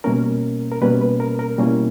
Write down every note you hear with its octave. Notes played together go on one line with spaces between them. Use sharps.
B2 G3 A#3 C#4 A#4
A#4
B2 G3 A#3 C#4 B4
B4
A#4
A#4
B2 G3 A#3 C#4 E4